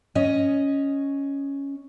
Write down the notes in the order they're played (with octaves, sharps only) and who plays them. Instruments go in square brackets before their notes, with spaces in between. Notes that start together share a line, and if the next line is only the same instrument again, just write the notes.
[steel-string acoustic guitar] C#4 C#5 D#5